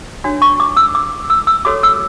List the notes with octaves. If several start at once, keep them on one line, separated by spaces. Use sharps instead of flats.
D4 F#4 C#5
C#6
D6
E6
D6
E6
E6
F#4 A4 C#5 D6
E6